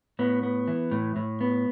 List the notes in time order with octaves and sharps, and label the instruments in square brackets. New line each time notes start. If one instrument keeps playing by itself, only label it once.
[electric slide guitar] A2 B3
B3
E3
A2
A2
B3